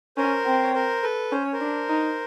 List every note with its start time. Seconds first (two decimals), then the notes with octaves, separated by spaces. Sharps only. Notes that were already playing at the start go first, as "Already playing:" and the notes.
0.17 C#4 A#4 C5
0.46 C4
0.64 C#5
0.74 A#4 C5
1.03 A4 B4
1.32 C#4 C5
1.42 C#5
1.53 A#4 C5
1.61 D4
1.89 D#4